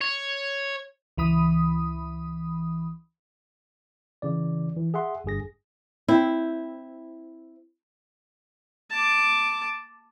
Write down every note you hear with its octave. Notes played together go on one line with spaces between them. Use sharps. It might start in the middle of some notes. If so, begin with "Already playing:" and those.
C#5
C#2 E3 B5 D#6
C#3 E3 D5
E3
G#4 E5 F#5 C6
G1 G2 G#4 A#6
C4 E4
A5 D6